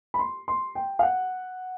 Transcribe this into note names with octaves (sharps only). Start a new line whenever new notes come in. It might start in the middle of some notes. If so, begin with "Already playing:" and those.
B5
C6
C6
G5
F5
F#5